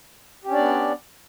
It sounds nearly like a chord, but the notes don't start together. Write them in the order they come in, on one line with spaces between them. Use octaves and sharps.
G4 C#4 D4 D5 B3